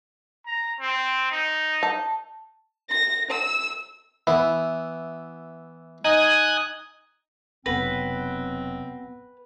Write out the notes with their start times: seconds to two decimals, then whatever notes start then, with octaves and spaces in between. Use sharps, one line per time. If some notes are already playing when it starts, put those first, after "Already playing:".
0.47 A#5
0.80 C4
1.31 D#4
1.83 A5
2.90 A#6
3.31 E6
4.27 E3 B3 E4
6.05 D#4 G#5 D#6 F#6
7.66 F1 B2 F#3 B3 C4 B4 F#5 A#6